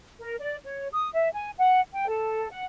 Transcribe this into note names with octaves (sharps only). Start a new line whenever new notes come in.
A#4
D5
C#5
D#6
E5
G#5
F#5
G5
A4
F#5